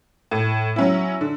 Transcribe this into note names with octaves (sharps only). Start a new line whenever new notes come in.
A2
F#3 C#4 E4
D3